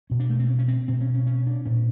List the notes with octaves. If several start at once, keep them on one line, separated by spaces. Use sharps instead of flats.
B2 C#4
D4
A3
C4
C#4
C#4
C4
B2 C4
C#4
C#4
C#4
D4
A#2 C#4